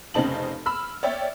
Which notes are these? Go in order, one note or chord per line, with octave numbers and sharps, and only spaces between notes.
F1 C#3 C4 D#4 A5 F#7
B5 E6 F6
C#5 D5 E5 G5